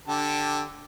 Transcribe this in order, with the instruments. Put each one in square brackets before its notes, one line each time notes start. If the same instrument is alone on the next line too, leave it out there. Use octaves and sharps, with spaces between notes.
[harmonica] D3 G4 A5